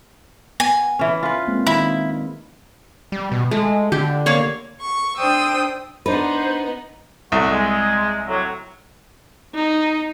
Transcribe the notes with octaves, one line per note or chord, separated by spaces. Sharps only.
B3 G#5
E3 C#4
F4 B4
G#3 A#3 C4
D#3 D#4 E4
G3
B2
G#3 A3
D3 G4
A#3 C#5 F5
C#6
D4 C5 G5 D#6 E6
B3 D4 D#4 B4 C5
C2 A3 F#4
G#3
A2 C3 F#3
D#4